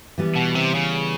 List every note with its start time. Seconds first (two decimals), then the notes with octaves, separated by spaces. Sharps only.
0.18 E3 G3 B3
0.36 B2
0.55 C3
0.75 C#3